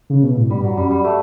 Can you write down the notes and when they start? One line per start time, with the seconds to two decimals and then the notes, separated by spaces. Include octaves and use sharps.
0.10 C#3
0.23 B2
0.37 A2
0.49 G2 G3
0.64 F#3
0.77 F#2 G3
0.91 G3
1.05 A3